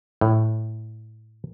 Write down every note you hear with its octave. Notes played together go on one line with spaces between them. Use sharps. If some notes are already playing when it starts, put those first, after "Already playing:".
A2